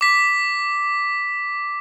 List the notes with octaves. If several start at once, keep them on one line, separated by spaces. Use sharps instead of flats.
D6 B6